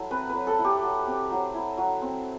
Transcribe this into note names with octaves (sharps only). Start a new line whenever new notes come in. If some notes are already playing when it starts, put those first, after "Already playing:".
Already playing: F#3 E4 A4
C4 B4
F#3 B4
A4
E4
G4
F#3
C4
F#3
E4
F#3
C4